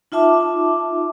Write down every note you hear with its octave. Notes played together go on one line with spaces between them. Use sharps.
D#4 F4 E5 A5 D6